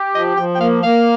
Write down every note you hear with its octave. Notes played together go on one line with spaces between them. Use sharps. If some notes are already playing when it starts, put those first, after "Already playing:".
Already playing: G4
F3 D#5
F3 G5
G5
A#3 F5
A#3 F5